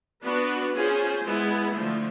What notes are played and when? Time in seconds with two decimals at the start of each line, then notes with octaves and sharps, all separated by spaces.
0.24 B3 D4 F#4 B4 D5
0.75 C#4 F4 G#4 C5
1.25 G#3 B3 E4
1.75 D3 F3 A3